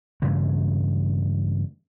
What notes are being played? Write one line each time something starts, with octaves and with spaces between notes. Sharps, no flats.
G2 C#3 E3 A3